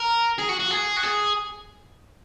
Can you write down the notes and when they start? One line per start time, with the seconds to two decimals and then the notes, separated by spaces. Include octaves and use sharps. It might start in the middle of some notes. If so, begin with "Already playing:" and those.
Already playing: A#4
0.38 G#4
0.49 F#4
0.60 F#4
0.71 G#4
0.96 F#4
1.03 G#4